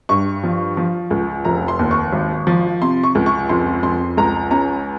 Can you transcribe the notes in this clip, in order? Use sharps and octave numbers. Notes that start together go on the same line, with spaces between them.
G2 C#6
F3
F3
C#2
F1 A#5
C6
D#2
C#6
G#1
F3
C3 C6
C#6
C#2
C#6
F2 C6
F2 C6
C#2 A#5
C#4 A#5